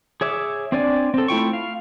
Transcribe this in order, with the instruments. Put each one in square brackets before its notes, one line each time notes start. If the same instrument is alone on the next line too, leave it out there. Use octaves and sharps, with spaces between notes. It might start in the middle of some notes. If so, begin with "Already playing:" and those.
[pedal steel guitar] G#4 C#5 E5 D6
C4 D4 C#5 D5 G#5
C4 A4
A3 E4 F4 G5 C#6
F5